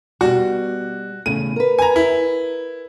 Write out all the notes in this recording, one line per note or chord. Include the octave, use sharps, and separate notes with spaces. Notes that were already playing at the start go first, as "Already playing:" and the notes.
B2 G3 F#4
E2 A2 C#3 D#7
A#4 B4
G#5 A#5
E4